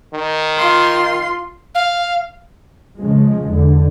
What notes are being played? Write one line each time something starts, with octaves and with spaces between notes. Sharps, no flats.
D#3
F4 C6
F5
C#3 F3 G#3
E2 D3